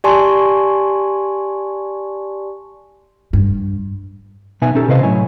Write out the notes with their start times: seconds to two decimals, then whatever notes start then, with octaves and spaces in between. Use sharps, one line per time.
0.04 G4 D5 G#5 A5 C6 C#6
3.33 G2
4.62 B1 B2 B3 D#4 E5 G#5
4.75 C#4 D#4 G4 A4
4.88 C3 E4 B4 C5 D#5 F5
5.03 A2 F#3 E4 C#5 G#5